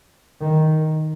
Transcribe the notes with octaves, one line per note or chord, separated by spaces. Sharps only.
D#3